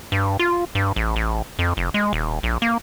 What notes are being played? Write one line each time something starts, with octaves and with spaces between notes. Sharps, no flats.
G2
F4
G2
A1
A1
F2
F1
G#3
D#1
A#1
A#3